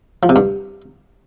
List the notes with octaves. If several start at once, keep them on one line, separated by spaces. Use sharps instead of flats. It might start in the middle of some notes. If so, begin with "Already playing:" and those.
F3
C3
G2